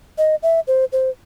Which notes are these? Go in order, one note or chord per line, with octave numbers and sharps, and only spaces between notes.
D#5
E5
C5
C5